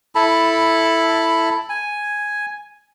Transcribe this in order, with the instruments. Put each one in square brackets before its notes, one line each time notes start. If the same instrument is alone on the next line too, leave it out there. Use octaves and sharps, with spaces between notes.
[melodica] E4 A4 A5 B5
G#5